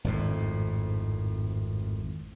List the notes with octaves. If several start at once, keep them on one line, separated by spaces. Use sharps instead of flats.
G#1 F2 A2